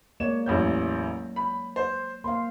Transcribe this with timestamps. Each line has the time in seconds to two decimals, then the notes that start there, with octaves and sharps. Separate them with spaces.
0.20 G#3 A#3 C#5 D5 E7
0.46 A1 E2 F#3 C#5 G6
1.36 B5
1.76 C5
2.24 A#3 C5 F5 C6